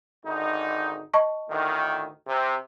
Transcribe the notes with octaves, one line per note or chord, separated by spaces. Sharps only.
G#1 D3 D#4
D#5 A5 C#6
D2 A2 D#3
C3